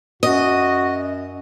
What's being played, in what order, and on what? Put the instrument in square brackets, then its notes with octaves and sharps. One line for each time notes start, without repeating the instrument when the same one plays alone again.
[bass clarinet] F#2 [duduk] F#4 [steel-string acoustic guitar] D#5